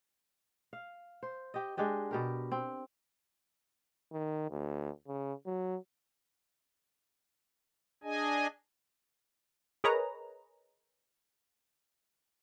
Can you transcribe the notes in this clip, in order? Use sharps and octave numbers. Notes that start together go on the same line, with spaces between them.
F5
C5
G4 D#5
G#3 D4 G4 D#5
B2 G4 A#4
C4
D#3
D2
C#3
F#3
D4 G#4 D#5 G#5
G#4 A#4 B4 C#5 D#5 A#5